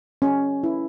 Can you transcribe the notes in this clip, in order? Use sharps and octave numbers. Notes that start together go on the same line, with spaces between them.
C#4
E4